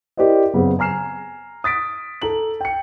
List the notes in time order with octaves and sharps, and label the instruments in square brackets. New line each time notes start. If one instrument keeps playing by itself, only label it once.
[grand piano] E4 G4 A#4 C5 D5 D#5
F#2 C#3 B3 C4
G#5 A#5 F6 C7 E7
D#6 A6 B6 D7
A4 A#5 F#7
G5 C#7